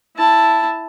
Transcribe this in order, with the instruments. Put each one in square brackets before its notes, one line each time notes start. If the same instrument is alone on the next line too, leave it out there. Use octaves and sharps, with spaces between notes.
[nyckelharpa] E4 A5